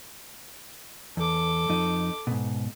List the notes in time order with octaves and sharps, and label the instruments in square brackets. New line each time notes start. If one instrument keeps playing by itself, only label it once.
[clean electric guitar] E2 [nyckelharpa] A4 D6
[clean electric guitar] F2 D#4
G#2 B2